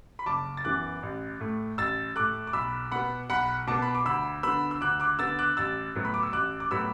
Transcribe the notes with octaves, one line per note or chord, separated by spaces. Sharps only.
B5
F#1 A5 D6
A6
F#2 E3 B3 D6 F#6
A1
A2 A3
A1 E6 A6
A2 A3 D6 F#6
D6
B1 B5 E6
B2 B3 F#5 B5
B1 F#5 B5
B2 B3 A5 D6
B5
D6
D2 B5 E6
D3 B3 B5 E6
E6
D2 D6 F#6
D6 F#6
D3 B3 E6 A6
D6 F#6
A1 E6 A6
A2 F#3 B3
B5
D6
E6
A1 D6 F#6
D6
A2 F#3 B3 B5 E6